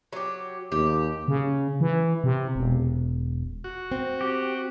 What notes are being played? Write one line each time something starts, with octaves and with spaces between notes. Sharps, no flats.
F#3 G4
D#2 G4
C#3
E3
C3
E1
F#4
C4
G4